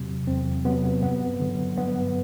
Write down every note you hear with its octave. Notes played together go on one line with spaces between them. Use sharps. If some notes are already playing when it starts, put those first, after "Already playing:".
Already playing: E2 C3 F#3
E2 C4
C3 F#3 B3
G2 B3
D3 F#3
G2 B3